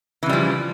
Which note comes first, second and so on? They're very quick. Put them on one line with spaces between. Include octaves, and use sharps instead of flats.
E3 C#3 G3 F3